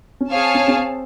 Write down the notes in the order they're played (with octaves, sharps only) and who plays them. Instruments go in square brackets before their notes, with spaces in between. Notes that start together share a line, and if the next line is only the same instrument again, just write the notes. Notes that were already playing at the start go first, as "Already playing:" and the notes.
[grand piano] C#4
[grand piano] C4 [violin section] G#4 C#5 F5 A5
[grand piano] C#4
C4
C#4
C4